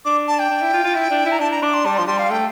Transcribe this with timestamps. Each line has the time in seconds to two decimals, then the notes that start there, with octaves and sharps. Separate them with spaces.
0.05 D4 D6
0.28 A5
0.39 G5
0.50 D4
0.62 E4
0.73 F4
0.84 F4
0.95 E4
1.10 D4
1.26 E4
1.32 A#5
1.40 D4 A5
1.51 A#5
1.62 D4 D6
1.74 C6
1.85 G3 A5
1.97 F3 C6
2.07 G3 C6
2.18 F5
2.30 A3 G5